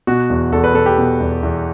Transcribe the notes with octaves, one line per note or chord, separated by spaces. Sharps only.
B2 F#4
E2
E2 A4
B4
B2 A4
G4
B2
E2
E2